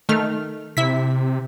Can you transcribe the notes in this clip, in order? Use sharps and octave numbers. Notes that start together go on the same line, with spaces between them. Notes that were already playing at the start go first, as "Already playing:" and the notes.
D#3 A3 F6
C3 E4 B6